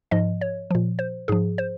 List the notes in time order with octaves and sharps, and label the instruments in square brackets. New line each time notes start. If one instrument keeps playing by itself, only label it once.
[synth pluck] G#2 F3 D#5
C#5
A#2 F3
C5
G#2 F3 G#4
C5